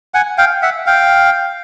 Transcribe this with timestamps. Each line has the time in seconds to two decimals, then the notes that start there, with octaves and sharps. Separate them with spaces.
0.14 F#5 G#5
0.38 F5 G5
0.62 E5 F#5
0.86 F5 G5